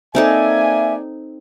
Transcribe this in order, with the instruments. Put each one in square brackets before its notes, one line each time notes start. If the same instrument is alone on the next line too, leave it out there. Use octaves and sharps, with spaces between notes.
[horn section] A#3 D5 G#5 [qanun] C4 D#4 A4 [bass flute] E5